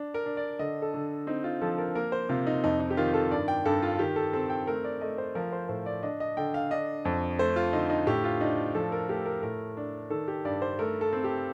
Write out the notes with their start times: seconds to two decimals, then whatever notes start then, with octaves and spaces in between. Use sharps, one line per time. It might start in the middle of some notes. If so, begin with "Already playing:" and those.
Already playing: D4
0.14 A#4
0.26 D4
0.37 D5
0.59 D3 D#5
0.82 A4
0.94 D3
1.27 C4 D#4
1.44 F4
1.62 F3 A4
1.78 A#4
1.95 A#3 A#4
2.12 C5
2.29 C3 F4
2.47 D#4
2.64 F2 D#4
2.80 D#4
2.90 G4
2.97 D#3 F4
3.14 A4
3.31 G2 D5
3.48 G5
3.65 G2 A4
3.82 F4
3.99 D#3 G4
4.16 A4
4.33 C4 A4
4.50 G5
4.67 A3 A#4
4.84 D5
5.01 A3 D#5
5.18 C5
5.35 F3 A#4
5.52 C5
5.69 A2 C5
5.86 D5
6.03 D4 D#5
6.20 D#5
6.37 D3 G5
6.54 F5
6.71 D4 D#5
7.05 F2
7.39 A3 C5
7.56 F4
7.73 D3 D#4
7.90 D#4
8.07 A2 G4
8.24 F4
8.41 D4 D#4
8.75 F3 A4
8.92 A#4
9.09 A3 G4
9.25 A#4
9.43 A2 A#4
9.77 D4
10.10 D#3 A4
10.28 G4
10.45 G2 D5
10.62 C5
10.79 A3 A#4
11.01 A4
11.13 C4
11.24 G4